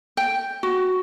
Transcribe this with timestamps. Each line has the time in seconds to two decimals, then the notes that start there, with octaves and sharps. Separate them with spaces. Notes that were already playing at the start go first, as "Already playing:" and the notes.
0.17 G5
0.63 F#4